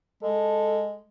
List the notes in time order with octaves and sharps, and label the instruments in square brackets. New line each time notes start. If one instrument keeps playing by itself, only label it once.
[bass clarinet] G#3 [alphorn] A4